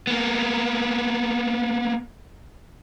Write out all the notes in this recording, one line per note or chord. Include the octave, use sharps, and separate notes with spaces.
A#3 B3